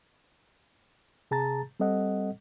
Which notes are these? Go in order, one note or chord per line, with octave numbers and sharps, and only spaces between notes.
C3 G#4 A5 A#5 A6
G3 C4 A4 D#5 F#5